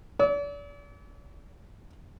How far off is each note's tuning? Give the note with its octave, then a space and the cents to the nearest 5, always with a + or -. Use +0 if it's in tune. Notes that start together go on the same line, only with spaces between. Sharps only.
D5 -40 E6 -40